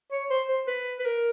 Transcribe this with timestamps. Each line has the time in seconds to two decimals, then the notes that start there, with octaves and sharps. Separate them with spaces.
0.12 C#5
0.30 C5
0.49 C5
0.67 B4
0.99 B4
1.05 A#4